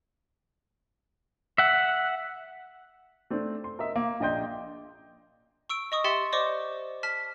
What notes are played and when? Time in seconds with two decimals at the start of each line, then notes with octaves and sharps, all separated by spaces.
1.58 E5 F#5
3.30 A3 C4 D4
3.64 C6
3.79 A#4 D#5 E5
3.96 A#3
4.20 A#1 D4 D#5 G5 C6 G6
5.70 C#6 E6 D7
5.92 D#5 C#6 D#6
6.04 G4 E5 G5 C6 A6 C#7
6.33 C5 D5 D#5 C#6 D6
7.03 A5 F6 B6